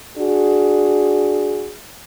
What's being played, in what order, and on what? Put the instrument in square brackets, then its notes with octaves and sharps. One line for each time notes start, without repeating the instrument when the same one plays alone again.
[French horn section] D4 F#4 G#4